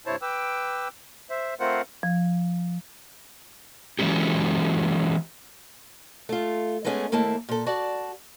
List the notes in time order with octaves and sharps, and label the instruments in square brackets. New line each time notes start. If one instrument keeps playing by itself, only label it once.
[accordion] G2 C3 E4 C5 C#5 A5
B4 G5 D6 E6
C5 E5
A3 C4 F4 A#4 C5 F#5
[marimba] F3
[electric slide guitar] E3 F#3 G#3 C#4 G4
[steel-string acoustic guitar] A3 F4
G#3 A3 B3 C#4 E4 G#4
D#2 A3 A#3 E4 A5
A#2 A4
F#4 D5 A5